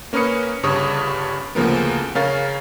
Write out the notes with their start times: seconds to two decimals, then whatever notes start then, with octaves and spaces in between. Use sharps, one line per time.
0.13 A#3 C#4 A#4 B4 D#6 C#7
0.63 G1 G2 C#3 C#5 D#6
1.55 D2 C#3 F3 A#3 B3
2.15 C#3 C#4 A#4 F5 A6